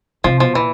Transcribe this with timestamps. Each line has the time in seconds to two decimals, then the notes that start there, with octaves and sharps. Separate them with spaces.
0.24 C3 F3
0.40 B2 F3
0.55 A#2 E3